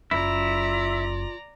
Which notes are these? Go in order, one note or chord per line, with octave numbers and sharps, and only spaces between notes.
F#1 E4 F4 D5 A#5